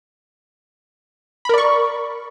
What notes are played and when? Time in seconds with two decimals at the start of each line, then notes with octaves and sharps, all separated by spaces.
1.45 B5
1.49 A#4
1.54 D5
1.58 C#6